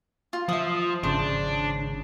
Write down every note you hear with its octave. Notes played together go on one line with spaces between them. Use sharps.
F4
F3 E5 D#6
G#1 C#3 D4 C5 A5